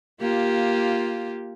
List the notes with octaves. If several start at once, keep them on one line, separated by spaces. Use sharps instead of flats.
A#3 F4 G4